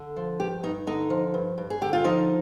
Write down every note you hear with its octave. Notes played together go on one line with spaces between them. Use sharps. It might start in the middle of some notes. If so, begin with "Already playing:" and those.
Already playing: D3
F3
G2 G4
G2 D#4
D3 D#4
F3
G2
G2
G#4
D3 G4
F4
F3 D#4